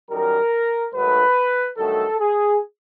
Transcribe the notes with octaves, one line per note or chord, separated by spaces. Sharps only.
F#2 D#3 G3 A#4
G#2 D#3 F#3 A3 B4
G2 D#3 F#3 A3 A4
G#4